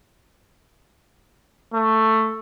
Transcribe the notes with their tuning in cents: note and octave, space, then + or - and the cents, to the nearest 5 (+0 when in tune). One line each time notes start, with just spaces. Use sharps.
A3 +10